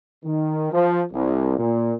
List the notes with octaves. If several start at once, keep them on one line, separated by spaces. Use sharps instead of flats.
D#3
F3
C2
A#2